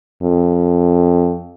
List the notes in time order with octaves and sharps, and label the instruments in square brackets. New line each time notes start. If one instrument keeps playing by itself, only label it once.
[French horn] F2